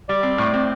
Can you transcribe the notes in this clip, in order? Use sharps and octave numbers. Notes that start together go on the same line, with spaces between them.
G3 D5
C4
A2
C4